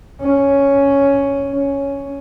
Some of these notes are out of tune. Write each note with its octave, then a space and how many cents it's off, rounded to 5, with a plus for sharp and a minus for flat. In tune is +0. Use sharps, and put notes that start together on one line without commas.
C#4 +5
C#4 +5